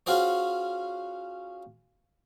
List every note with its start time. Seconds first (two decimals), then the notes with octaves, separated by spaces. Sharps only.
0.06 C#4 F4 F#4 G#4 C5 C#5